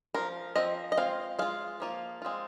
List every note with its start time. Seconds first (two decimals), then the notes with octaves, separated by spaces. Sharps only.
0.14 F3 A#3 F4 A#4
0.56 F3 C4 F4 D#5
0.92 D#5
0.97 G#3 C4 F4 F5
1.39 G#3 F4 F5
1.80 F3 A#3 F4
2.22 G#3 C4 F4